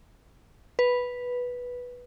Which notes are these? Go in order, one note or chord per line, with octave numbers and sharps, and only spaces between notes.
B4